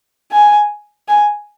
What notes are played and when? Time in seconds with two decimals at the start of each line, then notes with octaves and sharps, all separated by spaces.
0.32 G#5
1.08 G#5